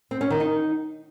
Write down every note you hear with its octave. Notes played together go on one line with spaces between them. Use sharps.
C4
C#4
D#3
D#4